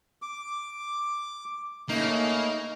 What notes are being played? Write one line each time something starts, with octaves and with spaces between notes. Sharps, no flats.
D6
C#3 A3 A#3 D#4